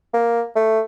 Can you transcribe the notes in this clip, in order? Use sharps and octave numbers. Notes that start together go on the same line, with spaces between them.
A#3
A3